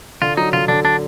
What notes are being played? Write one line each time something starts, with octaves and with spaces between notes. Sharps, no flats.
D3 F4
F#3 D#4
D3 F4
D3 D4
D4